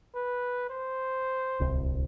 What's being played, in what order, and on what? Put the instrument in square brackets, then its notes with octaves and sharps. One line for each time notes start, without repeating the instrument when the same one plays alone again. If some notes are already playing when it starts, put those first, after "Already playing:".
[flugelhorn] B4
C5
[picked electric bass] D1 C2